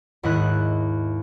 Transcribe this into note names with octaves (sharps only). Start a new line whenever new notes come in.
D#2 G#2 E4 D#5 F#6